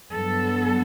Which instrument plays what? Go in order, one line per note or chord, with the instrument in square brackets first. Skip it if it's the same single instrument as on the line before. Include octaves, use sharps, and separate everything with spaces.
[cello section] G2 F#3 B3 A4